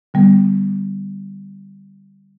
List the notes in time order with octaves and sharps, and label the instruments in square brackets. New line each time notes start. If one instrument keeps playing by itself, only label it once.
[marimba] D3 G3 B3